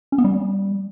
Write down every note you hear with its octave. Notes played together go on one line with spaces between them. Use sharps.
C#4
B3
G3